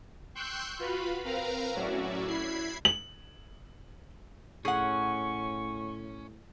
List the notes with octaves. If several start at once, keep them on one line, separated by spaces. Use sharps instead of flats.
G5 C6 C#6 E6 F#6 G6
F4 F#4 B4 F5 B5
C4 A#4 B4 F5 A#5
A2 F#3 C#4 F#4 D5 E5
E4 B5 G#6 C7
F#7
A2 C#4 G#4 F#5 C#6